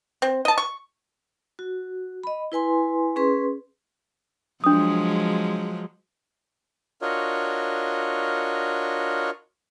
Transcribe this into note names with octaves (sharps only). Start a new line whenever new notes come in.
C4
D#5 A5
C#6
F#4
D#5 B5
E4 B4 G#5 C6
C#4 G#4 B4 C6
F3 F#3 G#3 D4 D#6
D4 F4 F#4 A#4 C#5 D#5